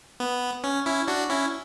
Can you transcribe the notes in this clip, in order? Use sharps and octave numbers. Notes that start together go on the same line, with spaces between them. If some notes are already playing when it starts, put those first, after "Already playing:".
B3
C#4
C#4 E4
D4 F#4
C#4 E4